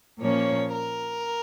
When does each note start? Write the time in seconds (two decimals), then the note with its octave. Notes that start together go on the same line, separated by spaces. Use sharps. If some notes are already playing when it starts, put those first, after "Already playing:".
0.20 A#2 F3 A#3 C#4 C#5
0.71 A#4